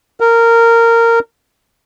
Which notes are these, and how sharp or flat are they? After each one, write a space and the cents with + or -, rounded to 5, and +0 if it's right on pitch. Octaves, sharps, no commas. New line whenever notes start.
A#4 -15